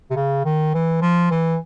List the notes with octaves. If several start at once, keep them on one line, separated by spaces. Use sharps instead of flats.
C3
C#3
D#3
E3
F3
E3